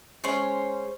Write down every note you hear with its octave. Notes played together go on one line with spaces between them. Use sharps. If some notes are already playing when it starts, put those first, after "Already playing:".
G#3 C#4 C5 C#5